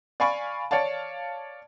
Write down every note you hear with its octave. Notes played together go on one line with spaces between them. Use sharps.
D5 F5 G#5 B5 C#6
C#5 D5 F5 A5